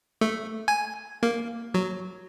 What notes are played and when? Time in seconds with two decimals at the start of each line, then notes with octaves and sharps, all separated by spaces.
0.21 A3
0.68 G#5
1.23 A#3
1.74 F#3